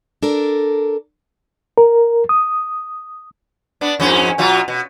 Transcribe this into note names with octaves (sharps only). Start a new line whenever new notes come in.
D4 A4 A#4
A#4
D#6
B3 D4
F2 G#2 C#4
B2 F#3 F4
B2